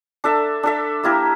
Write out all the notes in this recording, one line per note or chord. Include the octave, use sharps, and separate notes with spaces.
D4 A4 E5
D4 A4 E5
A#3 E4 G4 A#4